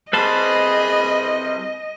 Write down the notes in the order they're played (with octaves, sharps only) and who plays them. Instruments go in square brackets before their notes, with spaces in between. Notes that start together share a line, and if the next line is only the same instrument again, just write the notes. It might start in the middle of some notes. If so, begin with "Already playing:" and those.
[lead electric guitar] G3 C4 [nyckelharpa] G#4 B5 [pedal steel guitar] B4 A5 C6 [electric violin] D#5